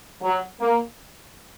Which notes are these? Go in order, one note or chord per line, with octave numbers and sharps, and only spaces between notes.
F#3
A#3